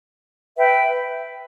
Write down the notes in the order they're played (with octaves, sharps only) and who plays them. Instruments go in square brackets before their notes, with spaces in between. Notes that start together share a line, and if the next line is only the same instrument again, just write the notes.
[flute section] B4 E5 G5